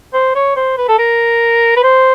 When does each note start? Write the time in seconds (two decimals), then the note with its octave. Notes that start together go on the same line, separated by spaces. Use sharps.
0.14 C5
0.35 C#5
0.56 C5
0.77 B4
0.89 A4
0.99 A#4
1.76 B4
1.83 C5